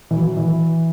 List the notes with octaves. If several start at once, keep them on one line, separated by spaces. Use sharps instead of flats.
E3
F#3
E3